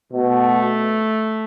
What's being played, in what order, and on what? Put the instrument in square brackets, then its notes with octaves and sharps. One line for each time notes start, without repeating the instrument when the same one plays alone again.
[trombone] B2 [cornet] A3